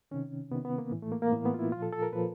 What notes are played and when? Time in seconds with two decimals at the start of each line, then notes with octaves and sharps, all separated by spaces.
0.11 C3 D#3 C#4
0.51 C3 D#3 B3
0.65 B3
0.78 A#3
0.91 A2 E3
1.02 A3
1.12 A#3
1.22 A#3
1.32 A2 E3 B3
1.45 B3
1.54 F4
1.59 E4
1.72 A#2 F3 F4
1.82 A4
1.93 A4
2.02 A#4
2.13 A#2 F3 B4